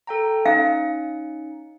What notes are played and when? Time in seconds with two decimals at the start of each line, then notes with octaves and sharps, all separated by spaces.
0.07 A4 G5 A#5
0.45 C#4 D#4 F5 C#7